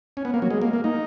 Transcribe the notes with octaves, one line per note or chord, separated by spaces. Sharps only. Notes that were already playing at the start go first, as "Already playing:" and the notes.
C#4
B3
A#3
F#3
G#3
A#3
A#3
D#4